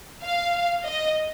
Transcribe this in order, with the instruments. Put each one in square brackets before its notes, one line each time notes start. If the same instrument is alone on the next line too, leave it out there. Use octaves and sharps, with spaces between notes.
[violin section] F5
D#5